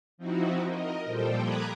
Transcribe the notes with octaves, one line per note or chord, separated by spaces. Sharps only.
F3 C4 D#4 E4 F#4
A#4 D#5
A#2 F3 G3 A4 C5 G5
A#5 B5 D6 D#6 F#6 G#6